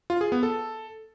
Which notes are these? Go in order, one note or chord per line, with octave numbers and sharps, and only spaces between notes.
F4
G#4
B3
A4